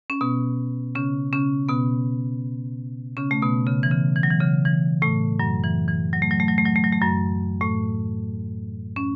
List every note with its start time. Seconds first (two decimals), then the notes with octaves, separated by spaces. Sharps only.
0.10 C#4
0.21 B2 B3
0.95 C#3 C#4
1.33 C#3 C#4
1.69 B2 B3
3.17 C#3 C#4
3.31 A3
3.42 B2 B3
3.67 C#3
3.83 E3
3.91 C#3
4.16 E3
4.23 F#3
4.30 E3
4.40 C#3
4.65 E3
5.02 A2 A3
5.40 F#2 F#3
5.64 E3
5.88 E3
6.13 F#3
6.22 A3
6.31 F#3
6.40 A3
6.48 F#3
6.58 A3
6.66 F#3
6.76 A3
6.84 F#3
6.93 A3
7.01 F#2 F#3
7.61 A2 A3
8.96 C#4